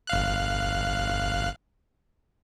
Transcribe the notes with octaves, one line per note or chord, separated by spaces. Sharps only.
G1 F5 F#6